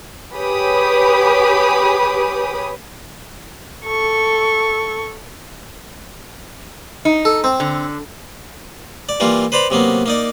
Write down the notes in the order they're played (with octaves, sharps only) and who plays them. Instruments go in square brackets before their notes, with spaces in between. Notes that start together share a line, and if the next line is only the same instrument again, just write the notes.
[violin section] G4 G#4 B4 C#5 B5 D#6
[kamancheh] A4 C#6
[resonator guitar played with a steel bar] D#4
[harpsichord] A4
C4
[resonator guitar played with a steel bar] D3
[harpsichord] D5
E3 G3 A#3 F4
B4 C5 D5 A#5 B5
C3 F#3 A#3 B3
A#3 D#4 D5